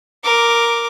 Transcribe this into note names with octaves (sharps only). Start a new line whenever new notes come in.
A#4 D6